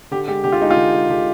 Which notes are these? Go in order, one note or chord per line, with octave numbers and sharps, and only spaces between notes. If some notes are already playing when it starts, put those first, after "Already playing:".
D3 G4
G#3 G4
D3 G4
F4
G#3 D#4
F4
D3
G#3
D3 G4